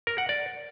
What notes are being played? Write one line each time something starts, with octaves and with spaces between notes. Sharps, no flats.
A#4
F#5
D5